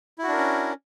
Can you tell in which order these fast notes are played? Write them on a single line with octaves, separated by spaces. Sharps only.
E4 F#4 D4 A#4 C#4